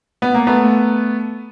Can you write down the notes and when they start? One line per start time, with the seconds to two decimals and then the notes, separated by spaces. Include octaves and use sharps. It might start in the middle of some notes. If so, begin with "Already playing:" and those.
0.22 B3
0.34 A#3
0.47 A3 B3